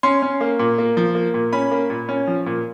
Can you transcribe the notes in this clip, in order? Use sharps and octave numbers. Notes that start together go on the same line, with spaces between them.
C#4 C6
C#4
A#3
A#2
A#3
F3
A#3
A#2
C#4 B5
A#3
A#2
C#4
F3
A#2